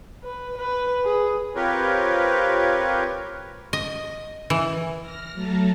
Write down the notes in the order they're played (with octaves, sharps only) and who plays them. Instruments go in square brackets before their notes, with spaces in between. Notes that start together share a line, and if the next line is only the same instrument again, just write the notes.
[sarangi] B4
B4
G#4
[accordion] C4 F4 G4 A#4 B4 C#5
[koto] D#5
E3
[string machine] F6 A#6
F#3 A3 A5 A#5